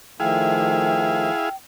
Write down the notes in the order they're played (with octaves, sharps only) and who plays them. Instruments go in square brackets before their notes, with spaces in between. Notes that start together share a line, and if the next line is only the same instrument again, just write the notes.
[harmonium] D#3 F3 A3 [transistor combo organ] E4 G#4 F5 [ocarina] G5